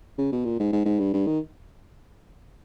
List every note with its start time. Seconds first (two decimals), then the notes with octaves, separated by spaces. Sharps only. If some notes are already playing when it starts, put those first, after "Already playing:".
0.18 C#3
0.32 B2
0.45 A#2
0.59 G#2
0.73 G#2
0.86 G#2
0.99 G2
1.14 G2
1.27 D#3